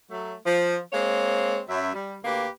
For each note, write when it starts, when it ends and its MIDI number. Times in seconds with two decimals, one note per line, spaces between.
0.11 0.34 54
0.11 0.34 57
0.45 0.78 53
0.93 1.60 56
0.93 1.60 58
0.93 1.60 60
0.93 1.60 73
1.69 1.94 42
1.69 1.94 76
1.94 2.14 55
2.24 2.47 38
2.24 2.47 58
2.24 2.47 67
2.24 2.47 71